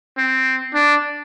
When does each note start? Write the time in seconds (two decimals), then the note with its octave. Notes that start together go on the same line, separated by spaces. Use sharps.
0.17 C4
0.74 D4